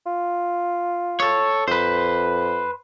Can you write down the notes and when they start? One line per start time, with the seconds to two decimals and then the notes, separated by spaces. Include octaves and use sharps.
0.06 F4
1.20 A4 C#5
1.68 F2 B4 C5